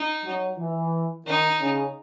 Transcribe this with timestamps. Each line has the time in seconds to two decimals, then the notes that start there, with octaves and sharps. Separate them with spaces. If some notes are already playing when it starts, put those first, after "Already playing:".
Already playing: D#4
0.24 F#3
0.58 E3
1.25 D#3 D#4
1.60 C#3